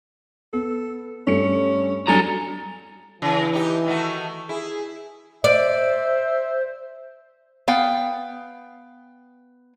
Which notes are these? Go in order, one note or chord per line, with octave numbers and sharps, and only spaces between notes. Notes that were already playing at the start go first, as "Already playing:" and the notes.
B3 A4
G2 A3 C#4 C#7
F#3 G3 D4 A4 G#5 A#5
C#3 E3
D#4 G4
D#3 A3 F#4
E4 G#4
C5 D5 E5
B3 F5 G5